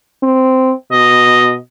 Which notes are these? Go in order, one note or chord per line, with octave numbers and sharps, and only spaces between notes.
C4
B2 D#5